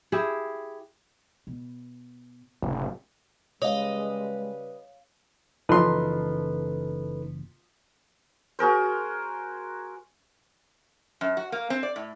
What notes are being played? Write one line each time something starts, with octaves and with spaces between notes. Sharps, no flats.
E4 G4 G#4 E5
B2
F#1 A2 C3
C#3 G3 G#3 B4 C#5 D#5 F5
F#1 E3 F3 D#4 A4 B4 C6
F#4 G#4 A#4 C5
F#2
F#4
A#3
C4
D5
A2